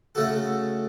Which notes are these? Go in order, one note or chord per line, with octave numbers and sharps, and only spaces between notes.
C#3 A3 F#4 A4